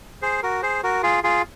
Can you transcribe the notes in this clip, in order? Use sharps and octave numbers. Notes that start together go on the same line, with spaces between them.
G#4 C5
F#4 A#4
G#4 C5
F#4 A#4
F4 G#4
F4 G#4